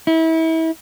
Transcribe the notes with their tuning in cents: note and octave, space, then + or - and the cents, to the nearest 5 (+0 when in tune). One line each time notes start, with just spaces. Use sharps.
E4 -30